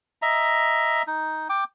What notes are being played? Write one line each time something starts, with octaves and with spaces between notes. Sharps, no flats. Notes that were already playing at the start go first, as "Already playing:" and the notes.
D#5 E5 A#5
D#4
G5 D6